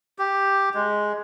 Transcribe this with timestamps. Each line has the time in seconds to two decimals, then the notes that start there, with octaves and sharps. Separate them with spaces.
0.19 G4
0.74 G#3